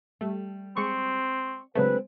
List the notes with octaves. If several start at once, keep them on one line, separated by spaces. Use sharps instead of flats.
G3 A3
G#3 C4 C#6
C#3 F#3 G#3 A3 C4 D4 B4